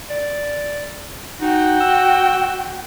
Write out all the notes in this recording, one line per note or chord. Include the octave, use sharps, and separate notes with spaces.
D5
D#4 F#4 G5
E6